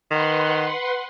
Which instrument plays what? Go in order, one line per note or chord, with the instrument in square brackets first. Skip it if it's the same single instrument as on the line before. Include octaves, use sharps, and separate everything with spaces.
[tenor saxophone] D#3 [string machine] B4 F#5 C6